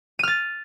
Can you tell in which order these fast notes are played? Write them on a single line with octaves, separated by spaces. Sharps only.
D#7 F6 A6